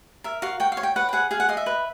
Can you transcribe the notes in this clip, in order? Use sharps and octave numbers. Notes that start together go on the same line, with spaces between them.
A#4 E5
F#4 F5
F#4 G5
F5
C#5
G5
B4 F#5
G5
G#4 F#5
G#4 F5
F#5
D#5 F5
E5
B4